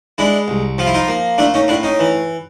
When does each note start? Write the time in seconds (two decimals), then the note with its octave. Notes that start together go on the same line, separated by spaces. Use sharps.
0.18 G#3 D4 E4
0.48 C2
0.78 F3 F4
0.87 E4
0.94 D#4 F4
1.08 A#3
1.38 A3 D4 E4
1.54 C#4 D#4
1.68 A2 D4 E4
1.83 C#4 D#4
1.99 E3